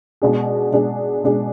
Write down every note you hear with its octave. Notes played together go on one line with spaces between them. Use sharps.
B2 G#3 D4 G#4
B2 G#3 D4 G#4
B2 G#3 D4 G#4